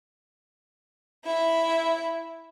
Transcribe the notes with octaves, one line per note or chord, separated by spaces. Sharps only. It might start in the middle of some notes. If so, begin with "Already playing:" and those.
E4 E5